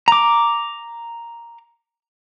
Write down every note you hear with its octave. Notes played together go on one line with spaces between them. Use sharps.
A#5 D6